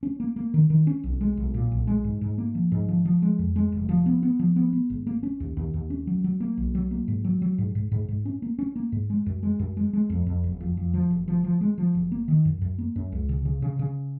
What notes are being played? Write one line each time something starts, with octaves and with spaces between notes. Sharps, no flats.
C#4
A#3
A#3
D#3
D#3
C#4
B1
G#3
B1
A#2
B1
G#3
G#2
G#2
A#3
F3
G#2
F3
F3
G#3
F2
G#3
F1
F3
B3
B3
F3
B3
B3
G#1
A#3
C#4
D#2
D#2
D#2
C#4
F#3
F#3
A#3
B1
F#3
A#3
G#2
F#3
F#3
G#2
G#2
G#2
G#2
C#4
A#3
C#4
A#3
G#2
G#3
F#2
G#3
F#2
G#3
G#3
F2
F2
F#1
F2
F2
F3
F#1
F3
F3
G#3
F3
F#1
A#3
D#3
F#2
F#2
A#3
F#2
C#2
C#3
C#3
C#3
C#3